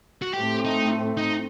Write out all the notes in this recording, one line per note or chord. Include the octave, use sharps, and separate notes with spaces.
F#4
A2 A3 C4 G4
D#4
D#4